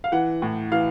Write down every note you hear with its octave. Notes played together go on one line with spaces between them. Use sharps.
F5
E3 F#5
A2
E3 F5